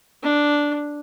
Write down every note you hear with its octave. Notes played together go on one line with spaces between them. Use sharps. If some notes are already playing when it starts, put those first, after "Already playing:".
D4